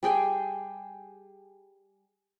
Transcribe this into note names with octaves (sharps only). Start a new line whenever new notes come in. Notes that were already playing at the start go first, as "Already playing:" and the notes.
G3 G#4 G5 G#5